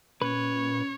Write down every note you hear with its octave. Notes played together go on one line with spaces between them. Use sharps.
A#2 C#4 B4 C#5